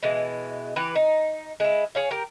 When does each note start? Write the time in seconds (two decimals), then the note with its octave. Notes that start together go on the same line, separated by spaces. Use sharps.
0.03 B2 E3 G#3
0.76 E3 G4 B4
0.95 D#4
1.60 G#3 E4
1.95 G#4 C#5 F5
2.11 G4 A#4